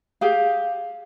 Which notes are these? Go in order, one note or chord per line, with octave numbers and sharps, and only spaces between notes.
G4 G#4 F5